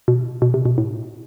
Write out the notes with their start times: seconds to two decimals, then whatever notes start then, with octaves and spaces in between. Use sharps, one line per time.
0.08 B2
0.42 B2
0.54 C3
0.65 B2
0.78 A2